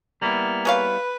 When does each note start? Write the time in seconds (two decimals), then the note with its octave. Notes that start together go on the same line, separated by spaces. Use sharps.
0.22 G3 A#3 B3 E4
0.65 G#4 B4 C#5 F5